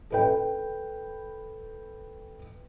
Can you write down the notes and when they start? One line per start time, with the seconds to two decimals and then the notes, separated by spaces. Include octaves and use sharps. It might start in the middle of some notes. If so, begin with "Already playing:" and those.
0.10 A4 B4 G5